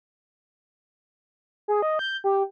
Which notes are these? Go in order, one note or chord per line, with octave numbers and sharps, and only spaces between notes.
G#4
D#5
G6
G4